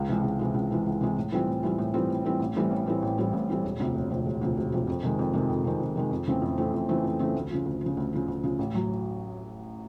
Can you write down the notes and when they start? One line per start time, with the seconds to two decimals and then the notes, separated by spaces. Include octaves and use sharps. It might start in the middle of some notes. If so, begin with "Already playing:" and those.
Already playing: C#2
0.08 C3 E3 G#3
0.23 C#2
0.39 C3 E3 G#3
0.54 C#2
0.71 C3 E3 G#3
0.86 C#2
1.01 C3 E3 G#3
1.16 A2
1.32 E3 G3 C4 F4
1.47 A2
1.63 E3 G3 C4 F4
1.78 A2
1.94 E3 G3 C4 F4
2.10 A2
2.25 E3 G3 C4 F4
2.40 A1
2.55 A2 E3 G3 C4
2.71 A1
2.86 A2 E3 G3 C4
3.02 A1
3.17 A2 E3 G3 C4
3.33 A1
3.49 A2 E3 G3 C4
3.64 E1
3.79 D2 C3 F3
3.94 E1
4.10 D2 C3 F3
4.26 E1
4.41 D2 C3 F3
4.57 E1
4.72 D2 C3 F3
4.87 F2
5.03 C3 D#3 G#3
5.19 F2
5.33 C3 D#3 G#3
5.49 F2
5.64 C3 D#3 G#3
5.80 F2
5.96 C3 D#3 G#3
6.11 F2
6.27 C#3 E3 A3 C4
6.42 F2
6.57 C#3 E3 A3 C4
6.74 F2
6.89 C#3 E3 A3 C4
7.04 F2
7.19 C#3 E3 A3 C4
7.35 D2
7.50 C#3 F3
7.65 D2
7.81 F3
7.86 C#3
7.97 D2
8.13 C#3 F3
8.28 D2
8.43 C#3 F3
8.59 A1
8.74 A2 F#3